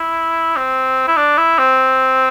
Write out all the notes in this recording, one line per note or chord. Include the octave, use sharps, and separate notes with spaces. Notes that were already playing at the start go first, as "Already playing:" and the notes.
Already playing: E4
C4
E4
D4
E4
C4